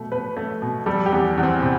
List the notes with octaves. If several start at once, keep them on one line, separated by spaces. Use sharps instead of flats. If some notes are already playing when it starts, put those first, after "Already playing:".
Already playing: B2 A3
B2 B4
A3
B2
G3 A4
G4
E2
E2
C4
C3